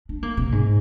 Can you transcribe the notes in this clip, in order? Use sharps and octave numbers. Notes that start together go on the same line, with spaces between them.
D4
A#3
C3
G#2